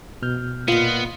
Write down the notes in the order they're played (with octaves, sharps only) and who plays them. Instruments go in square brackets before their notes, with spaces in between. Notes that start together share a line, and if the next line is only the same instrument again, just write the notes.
[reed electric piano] B2 F6 G6
[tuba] A#2 [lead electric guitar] B3 [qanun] F4 D#5